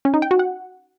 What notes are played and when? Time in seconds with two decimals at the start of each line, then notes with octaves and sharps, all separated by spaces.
0.05 C#4
0.14 D#4
0.22 G5
0.31 F#4
0.39 F#5